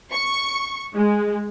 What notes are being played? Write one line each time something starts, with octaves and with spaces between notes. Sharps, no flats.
C#6
G#3